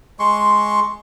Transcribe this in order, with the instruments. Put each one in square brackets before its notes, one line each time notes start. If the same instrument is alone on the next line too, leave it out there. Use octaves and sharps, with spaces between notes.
[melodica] G#3 C6 C#6